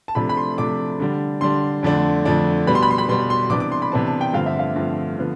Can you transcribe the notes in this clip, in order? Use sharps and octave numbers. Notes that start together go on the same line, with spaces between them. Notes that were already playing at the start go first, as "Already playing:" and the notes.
A5
C3 F3 A3 D4 B5
B5
C6
C3 F3 A3 D4 D6
D3 G3 D4
D3 G3 D4 C6
F2 D3 A3 D4
F2 D3 A3 D4
B2 G3 B3 B5
C6
B5
C6
B5
B2 G3 B3 C6
C6
C3 E3 B3 D4 D6
D6
C6
B5
C3 E3 B3 D4 A5
A5
G5
G2 D3 F3 A3 C4 F5
E5
F5
G2 D3 F3 A3 C4
D3 F3 B3